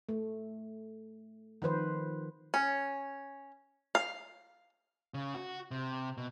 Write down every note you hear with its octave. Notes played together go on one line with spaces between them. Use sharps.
A3
D#3 F3 B4 C5
C#4
F5
C#3
F#4
C3
B2